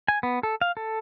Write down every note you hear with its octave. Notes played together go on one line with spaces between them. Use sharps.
G#5
B3
A4
F5
A4